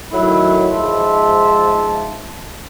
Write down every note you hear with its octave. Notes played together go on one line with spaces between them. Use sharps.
D#3 F#3 A3 E4 B5
G#2 F3 E5 A5 C6